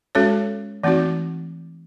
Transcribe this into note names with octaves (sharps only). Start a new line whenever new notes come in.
G#3 C#4 F#4 A4 C#5
E3 A3 C4 D#4 F#4